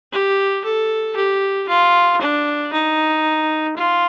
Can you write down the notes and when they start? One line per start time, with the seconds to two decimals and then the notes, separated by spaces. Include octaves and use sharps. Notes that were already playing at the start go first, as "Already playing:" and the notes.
0.12 G4
0.64 A4
1.16 G4
1.68 F4
2.21 D4
2.72 D#4
3.76 F4